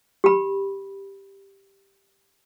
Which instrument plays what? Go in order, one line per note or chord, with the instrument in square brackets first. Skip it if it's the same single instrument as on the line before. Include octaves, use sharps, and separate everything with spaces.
[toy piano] G4 B5